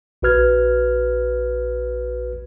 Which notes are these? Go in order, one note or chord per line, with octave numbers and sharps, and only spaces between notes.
A#1 F#4 B4 F6 G#6